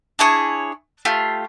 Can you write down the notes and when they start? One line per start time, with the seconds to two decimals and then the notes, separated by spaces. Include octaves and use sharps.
0.19 D4 E4 G#4 C#5
1.05 A3 F4 G4